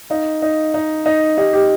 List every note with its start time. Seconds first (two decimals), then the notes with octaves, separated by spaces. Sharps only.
0.10 D#4 F5
0.42 D#4
0.74 D#4
1.06 D#4
1.37 D#4 G4
1.53 G4